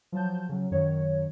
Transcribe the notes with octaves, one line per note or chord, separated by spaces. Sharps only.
F3 F#3 A5 G6
C#3 F#3
F#2 D#3 C#5